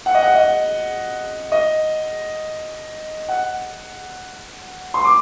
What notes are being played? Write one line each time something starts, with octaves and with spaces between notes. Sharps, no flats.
F#5
D#5
F#5
D#5
D#5
F#5
C6
D6